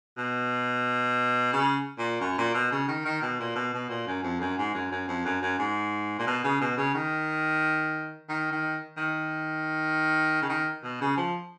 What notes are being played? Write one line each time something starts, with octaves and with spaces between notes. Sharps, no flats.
B2
C#3
A#2
F#2
A#2
B2
C#3
D#3
D#3
B2
A#2
B2
B2
A#2
F#2
F2
F#2
G#2
F#2
F#2
F2
F#2
F#2
G#2
A#2
B2
C#3
B2
C#3
D#3
D#3
D#3
D#3
C#3
D#3
B2
C#3
F3